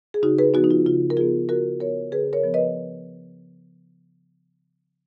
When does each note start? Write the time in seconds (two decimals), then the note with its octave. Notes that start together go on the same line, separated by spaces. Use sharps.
0.14 G#4
0.23 C#3 D#4 F#4
0.38 G#4 B4
0.54 F3 B3 D#4 F#4
0.64 D#4
0.71 F4
0.86 C#3 F4
1.10 A#4
1.17 F3 B3 F4 G#4
1.49 C#3 F#4 A#4
1.80 F3 B3 A#4 C#5
2.12 C#3 G#4 B4
2.33 A#4 C#5
2.44 F3 B3
2.54 B4 D#5